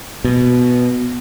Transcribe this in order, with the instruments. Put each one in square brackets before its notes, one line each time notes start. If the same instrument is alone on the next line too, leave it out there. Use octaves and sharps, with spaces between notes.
[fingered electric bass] B2